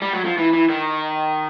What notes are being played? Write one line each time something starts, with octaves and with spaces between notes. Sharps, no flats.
G3
F#3
F3
E3
E3
D#3